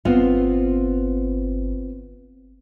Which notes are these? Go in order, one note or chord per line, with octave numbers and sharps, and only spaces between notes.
G1 B3 C4 F4